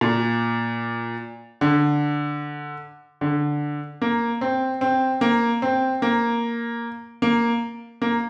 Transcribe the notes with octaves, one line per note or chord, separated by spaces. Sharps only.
A#2
D3
D3
A#3
C4
C4
A#3
C4
A#3
A#3
A#3